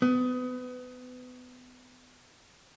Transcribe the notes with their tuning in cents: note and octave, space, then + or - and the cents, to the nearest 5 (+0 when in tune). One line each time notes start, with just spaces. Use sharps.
B3 +30